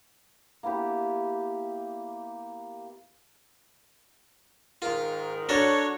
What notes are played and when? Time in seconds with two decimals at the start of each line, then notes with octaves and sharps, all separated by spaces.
0.63 A#3 B3 E4 G4
4.82 G#2 D#3 F4 A#4
5.49 D4 F#4 A4 A#4 C#5